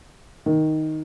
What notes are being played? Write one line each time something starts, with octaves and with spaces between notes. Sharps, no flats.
D#3